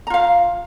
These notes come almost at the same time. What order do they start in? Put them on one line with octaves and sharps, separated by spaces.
A#5 F4 F5